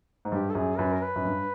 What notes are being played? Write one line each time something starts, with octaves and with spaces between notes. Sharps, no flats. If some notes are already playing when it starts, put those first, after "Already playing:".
G#2
G2 G4
A4
F#2 G#4
F#2 B4
A#4
B4
F#2
G2